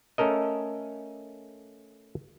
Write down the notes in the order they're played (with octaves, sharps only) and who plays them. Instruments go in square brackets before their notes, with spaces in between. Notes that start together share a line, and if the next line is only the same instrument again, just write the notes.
[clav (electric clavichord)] A3 C#4 A4 A#4 D#5